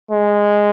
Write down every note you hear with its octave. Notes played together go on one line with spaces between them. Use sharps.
G#3